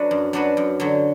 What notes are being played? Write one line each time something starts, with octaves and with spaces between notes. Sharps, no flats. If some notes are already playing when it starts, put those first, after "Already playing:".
Already playing: F#3 D4 F#4 B4
F#2
F#3 D4 F#4 B4
F#2
D3 F#3